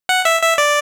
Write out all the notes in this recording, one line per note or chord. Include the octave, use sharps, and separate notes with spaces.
F#5
E5
E5
D5